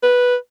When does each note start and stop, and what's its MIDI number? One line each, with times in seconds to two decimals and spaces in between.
0.03 0.36 71